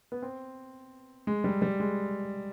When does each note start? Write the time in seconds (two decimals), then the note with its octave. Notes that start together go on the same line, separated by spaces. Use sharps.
0.12 B3
0.22 C4
1.27 G#3
1.44 G3
1.62 G3
1.80 G#3